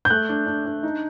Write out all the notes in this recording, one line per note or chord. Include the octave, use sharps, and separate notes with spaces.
G6
A3 F#6
D4
D4
D4
D#4